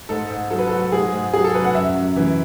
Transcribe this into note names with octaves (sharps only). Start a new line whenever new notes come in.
G#2 A4
G#2
F#3 A4
B4
F#3 A4
G#2 G#4
G#2
F#3 G#4
A4
F#3 B4
F#5
F#2 E5
F#2
E3